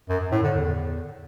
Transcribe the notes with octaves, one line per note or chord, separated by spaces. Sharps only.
F#2
F#2
A2
D3
E2